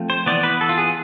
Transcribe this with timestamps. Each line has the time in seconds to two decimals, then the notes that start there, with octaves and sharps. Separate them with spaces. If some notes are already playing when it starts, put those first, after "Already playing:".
Already playing: F3 A3 C4
0.10 C5
0.26 E3 B3 D5
0.43 B4
0.61 A4
0.69 F4
0.78 G#4